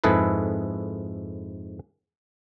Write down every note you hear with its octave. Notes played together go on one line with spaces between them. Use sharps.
F2 G#2 E4 G#4 A4 B4